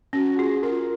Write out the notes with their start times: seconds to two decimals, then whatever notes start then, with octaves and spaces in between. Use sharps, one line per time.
0.13 C#4 F#4
0.38 F4 G#4
0.63 F4 A#4